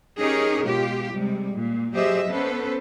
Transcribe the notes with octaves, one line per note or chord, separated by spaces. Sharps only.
C#4 D#4 G4 G#4 A#4 C#5
B2 G#3 F4 G4
C3 G3 G#3
A#2
F#3 G4 G#4 C5 D#5 E5
B3 C#4 A4 B4 C5